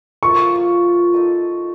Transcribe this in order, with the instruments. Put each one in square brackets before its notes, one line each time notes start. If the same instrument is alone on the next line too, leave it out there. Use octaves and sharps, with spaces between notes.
[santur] F3 A#3 F4 A4 [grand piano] C#6
[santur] D#4 A4 D#5